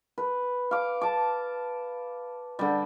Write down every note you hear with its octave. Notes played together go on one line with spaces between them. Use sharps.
B4
F5 D6
A5 D6
D3 G3